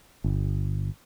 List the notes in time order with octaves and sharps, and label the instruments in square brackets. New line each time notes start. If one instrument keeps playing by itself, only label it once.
[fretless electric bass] G1